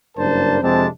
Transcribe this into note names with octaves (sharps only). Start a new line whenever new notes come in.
F#1 G2 D4 A#4 C5 A5
F2 C3 G#3 C4 D4 A5